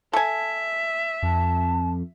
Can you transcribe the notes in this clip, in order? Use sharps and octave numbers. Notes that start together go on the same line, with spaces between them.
A4 E5 G#5
F2 A5